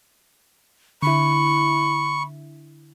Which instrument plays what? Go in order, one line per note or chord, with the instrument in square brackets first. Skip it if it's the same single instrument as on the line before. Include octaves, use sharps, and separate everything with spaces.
[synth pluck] D3 E4 [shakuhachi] B5 [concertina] C#6